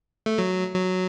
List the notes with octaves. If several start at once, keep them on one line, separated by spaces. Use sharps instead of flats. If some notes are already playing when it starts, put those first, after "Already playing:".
A3
F#3
F#3